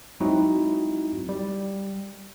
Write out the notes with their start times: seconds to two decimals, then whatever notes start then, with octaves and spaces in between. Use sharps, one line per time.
0.20 F#3 G#3 C4 D#4 E4 F#4
1.29 G3